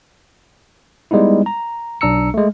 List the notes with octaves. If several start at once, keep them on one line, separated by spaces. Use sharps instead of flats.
G3 G#3 B3 D#4 E4
A#5
B1 D4 A#5 E6 C#7
G#3 A3